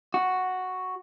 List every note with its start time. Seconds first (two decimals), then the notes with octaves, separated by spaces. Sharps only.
0.14 F#4